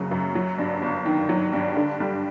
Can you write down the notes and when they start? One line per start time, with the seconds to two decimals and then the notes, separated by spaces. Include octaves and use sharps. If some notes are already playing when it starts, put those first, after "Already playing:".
Already playing: F#1 F#2 C#3 F#3
0.11 F#2
0.35 F#3
0.58 G2
0.82 G1
1.06 D#3
1.29 F#3
1.53 G2
1.76 D3
2.00 G3